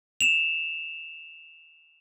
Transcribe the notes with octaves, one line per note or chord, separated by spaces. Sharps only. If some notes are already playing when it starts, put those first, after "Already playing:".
E7 F7